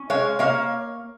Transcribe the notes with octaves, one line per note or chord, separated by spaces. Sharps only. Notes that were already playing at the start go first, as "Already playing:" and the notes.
Already playing: C#4
G#3 C#5 F5
A#3 C#5 F5